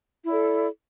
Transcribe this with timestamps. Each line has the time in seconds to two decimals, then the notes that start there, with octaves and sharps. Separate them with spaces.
0.24 E4
0.28 D5
0.31 A4